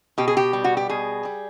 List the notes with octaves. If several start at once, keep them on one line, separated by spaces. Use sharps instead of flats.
B2 G4
G#4
G4
G3
F#4
G4
B2 G#4
G3